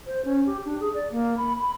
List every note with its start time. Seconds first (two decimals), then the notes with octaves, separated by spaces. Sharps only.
0.07 C5
0.25 C#4
0.46 G4
0.65 D4
0.80 G#4
0.94 D5
1.12 A#3
1.37 B5
1.58 B5